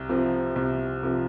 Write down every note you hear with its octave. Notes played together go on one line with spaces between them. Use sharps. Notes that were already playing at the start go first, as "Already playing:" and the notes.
Already playing: C2
C3 F3
C2
C3 F3